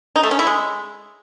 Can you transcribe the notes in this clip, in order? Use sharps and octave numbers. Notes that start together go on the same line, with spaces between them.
D#4
A3
C#4
E4
G#3